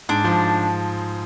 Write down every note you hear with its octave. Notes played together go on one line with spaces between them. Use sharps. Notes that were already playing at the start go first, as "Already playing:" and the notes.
G#2 D4
F3